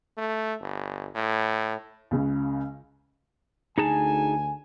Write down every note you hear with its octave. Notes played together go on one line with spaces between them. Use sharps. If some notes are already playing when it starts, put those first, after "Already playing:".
A3
G1
A2
C#2 C#3
D2 D#4 G#4 G#5 A5